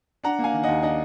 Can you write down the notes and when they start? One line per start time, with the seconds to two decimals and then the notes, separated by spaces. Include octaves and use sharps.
0.24 D4 F#5 A#5
0.39 A#3
0.44 F5 G#5
0.54 D#3
0.63 D#2 D#5 F#5
0.83 D4 D#5 F#5